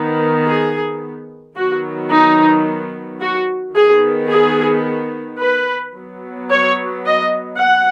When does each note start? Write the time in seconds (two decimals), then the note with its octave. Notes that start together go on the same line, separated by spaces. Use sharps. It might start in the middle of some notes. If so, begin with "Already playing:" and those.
Already playing: D#3 B3
0.47 G#4
1.56 D#3 F#3 B3 F#4
2.11 D#4
3.21 F#4
3.75 D#3 B3 G#4
4.30 G#4
5.40 B4
5.96 F#3 B3
6.51 C#5
7.05 D#5
7.61 F#5